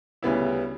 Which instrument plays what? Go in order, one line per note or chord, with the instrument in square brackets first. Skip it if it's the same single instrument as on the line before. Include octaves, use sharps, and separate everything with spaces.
[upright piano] D2 C#3 G3 B3 E4